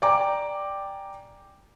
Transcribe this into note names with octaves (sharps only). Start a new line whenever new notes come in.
D5 G5 G#5 A#5 D6